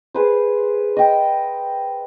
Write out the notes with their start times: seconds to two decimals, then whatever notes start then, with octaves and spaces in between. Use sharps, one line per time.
0.14 G#4 B4 C5
0.97 D#5 G5